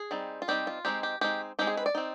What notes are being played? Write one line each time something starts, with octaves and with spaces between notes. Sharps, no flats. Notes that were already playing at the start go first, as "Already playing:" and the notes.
Already playing: G#4
G3 C4 D#4
F4
G3 C4 D#4 G4
F4
G#3 C4 D#4 G4
G4
G#3 C4 D#4 G4
G#3 C4 D#4 G4
G#4
B4
D5
C4 D#4